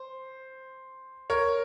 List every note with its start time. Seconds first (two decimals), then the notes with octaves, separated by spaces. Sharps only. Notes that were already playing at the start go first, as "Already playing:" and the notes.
Already playing: C5
1.30 A#4 C#5